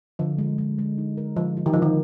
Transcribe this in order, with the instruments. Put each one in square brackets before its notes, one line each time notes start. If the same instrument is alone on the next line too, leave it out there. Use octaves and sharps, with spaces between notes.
[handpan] D3 [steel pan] F3
[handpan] G#3
G#3
G#3
D#4
A#4
[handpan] D3 [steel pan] F3
[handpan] F4
[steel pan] D#3
[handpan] D3 [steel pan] F3
[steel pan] D#3